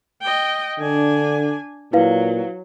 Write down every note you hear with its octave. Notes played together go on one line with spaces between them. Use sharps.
D#5 G5
D3 D4 G#5
A#2 F#3 E4 B4 F5